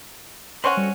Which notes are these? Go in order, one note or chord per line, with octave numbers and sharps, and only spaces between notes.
C4 C#4 B4 F#5 C6 C#6
G3 F#4 A4